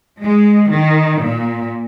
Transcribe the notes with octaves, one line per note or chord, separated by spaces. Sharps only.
G#3
D#3
A#2